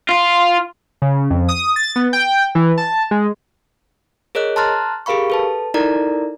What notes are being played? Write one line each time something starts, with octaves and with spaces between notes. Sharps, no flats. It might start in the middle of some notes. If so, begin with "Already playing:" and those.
F4
C#3
F2
D#6
A6
B3
G5
E3
A5
G#3
G#4 A#4 C#5 D#5 F#6
A5 A#5 C6 F6 F#6 A6
G4 G#4 A#4 F5 B5 C#6
A4 B4 A5
D#4 E4 A4 A#4 D5 A#5